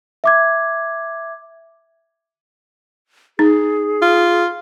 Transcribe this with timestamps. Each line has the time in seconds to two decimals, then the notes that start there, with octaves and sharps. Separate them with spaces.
0.24 E5 D6 G#6
3.39 D#4 G#4
4.02 F4